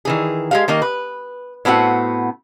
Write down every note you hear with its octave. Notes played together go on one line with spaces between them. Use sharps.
D#3 E3 G#4
G#3 G4 F5
D#3 A#3 D#4 D#5
B4
A2 B3 C4 F#4 F#5